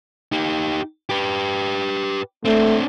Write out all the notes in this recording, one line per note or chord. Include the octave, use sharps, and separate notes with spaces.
D#4 G4
G4 B4
A3 C4 D4